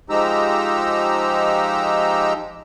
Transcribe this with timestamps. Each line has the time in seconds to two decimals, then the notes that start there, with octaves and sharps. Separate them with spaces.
0.10 F3 G#3 D#4 G4 A#5 E6